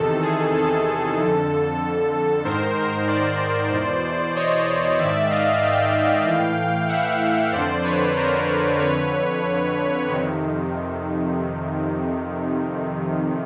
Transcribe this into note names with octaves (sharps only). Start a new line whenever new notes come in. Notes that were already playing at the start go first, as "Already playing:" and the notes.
Already playing: E2 C3 D#3 A4
G#4
A4
F2 D3
G#2 D#3 A#4 C5
A#4 C5
C5 D5
E2 B2
C#5 D#5
G#2 D#3 D5 E5
D#5 F5
F5 G5
A2 E3
E5 F#5
F2 D3 C5 D5
B4 C#5
A#4 C5
F2 D3 B4 C#5
F2 C3 D#3